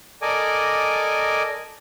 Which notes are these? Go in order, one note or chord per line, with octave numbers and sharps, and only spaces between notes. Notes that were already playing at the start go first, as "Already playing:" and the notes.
A4 A#4 D5 D#5 G#5 D6